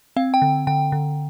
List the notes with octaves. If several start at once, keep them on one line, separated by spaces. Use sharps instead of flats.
C4 F5
G5
D3
D3 G5
D3